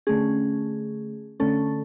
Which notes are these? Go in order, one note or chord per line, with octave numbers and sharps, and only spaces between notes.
D3 A3 C#4 G#4
D3 A3 C#4 A4